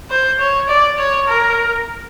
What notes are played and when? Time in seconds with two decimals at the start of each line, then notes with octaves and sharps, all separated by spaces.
0.10 C5
0.39 C#5
0.69 D5
0.98 C#5
1.28 A#4